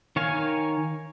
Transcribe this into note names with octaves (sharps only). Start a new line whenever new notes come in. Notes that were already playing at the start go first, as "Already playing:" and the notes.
D#3 C#5 F5 G#5